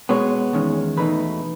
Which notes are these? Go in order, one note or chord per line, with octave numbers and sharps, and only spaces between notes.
B2 G#3 B3 C#5
E2 D#3 G#3 C#4
E2 B2 A3 D#4 B4